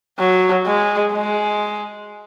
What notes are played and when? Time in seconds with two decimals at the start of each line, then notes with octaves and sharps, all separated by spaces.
0.19 F#3
0.66 G#3
1.13 G#3